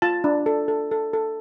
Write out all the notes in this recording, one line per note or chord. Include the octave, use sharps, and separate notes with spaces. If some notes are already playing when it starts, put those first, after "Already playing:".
F4 A5
D4
A4
A4
A4
A4